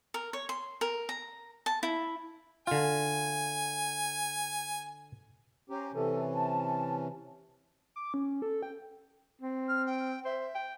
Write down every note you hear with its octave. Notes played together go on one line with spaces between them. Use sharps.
A#4
C#5
C6
A#4
A#5
A5
E4
D3 F4 G#5
C#4 G4 C5 A#5
C3 E3 C#4 A4
A5
D6
C#4
A4
G5
C4
F6
G5
C5 E5
G5